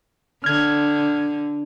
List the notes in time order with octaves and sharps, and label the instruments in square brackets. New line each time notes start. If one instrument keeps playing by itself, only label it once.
[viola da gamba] D3 [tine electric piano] F6 G#6